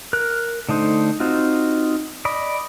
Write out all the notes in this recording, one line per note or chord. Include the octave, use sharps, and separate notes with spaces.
A#4 F#6
D3 A3 D#4 C5
C4 D#4 F4 F#4
D5 D#5 B5